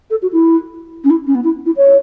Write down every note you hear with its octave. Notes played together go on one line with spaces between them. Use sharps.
A4
F#4
E4
C#4
E4
C#4
B3
E4
E4
C#5